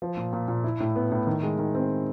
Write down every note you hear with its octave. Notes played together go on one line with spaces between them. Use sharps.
F3
A#2
A#2
A#2
E4
A2
B3
A2
D#3
G#3
D#3
C4